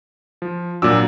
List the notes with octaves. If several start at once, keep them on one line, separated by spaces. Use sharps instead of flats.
F3
A#2 F#3 D4 D6 E6